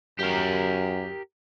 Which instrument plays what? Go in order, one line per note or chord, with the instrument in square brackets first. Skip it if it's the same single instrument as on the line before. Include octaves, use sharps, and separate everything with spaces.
[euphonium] F#2 [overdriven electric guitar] G4 A#4